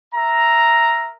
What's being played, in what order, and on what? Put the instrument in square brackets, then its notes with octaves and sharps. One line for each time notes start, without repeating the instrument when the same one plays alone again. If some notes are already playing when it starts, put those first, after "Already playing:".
[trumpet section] A#4 E5 A#5